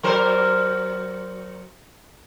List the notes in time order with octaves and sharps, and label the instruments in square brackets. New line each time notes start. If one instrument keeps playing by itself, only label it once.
[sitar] F#3 A#4 C5